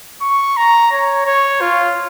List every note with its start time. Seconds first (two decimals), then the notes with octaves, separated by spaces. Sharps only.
0.21 C#6
0.56 A#5
0.92 C#5
1.26 C#5
1.61 F4